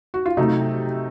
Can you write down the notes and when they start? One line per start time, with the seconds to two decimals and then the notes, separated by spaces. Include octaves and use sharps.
0.14 F#4
0.26 F4
0.37 C3 F#3 A3 D#4